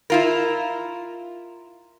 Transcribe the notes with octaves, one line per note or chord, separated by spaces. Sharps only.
E4 F4 A#4